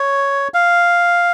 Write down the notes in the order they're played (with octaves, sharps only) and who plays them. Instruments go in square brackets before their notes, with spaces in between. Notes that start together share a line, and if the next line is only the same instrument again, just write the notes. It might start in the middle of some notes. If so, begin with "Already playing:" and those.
Already playing: [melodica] C#5
F5